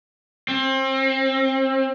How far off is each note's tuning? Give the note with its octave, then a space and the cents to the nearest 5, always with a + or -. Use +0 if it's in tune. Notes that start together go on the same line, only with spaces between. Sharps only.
C4 +30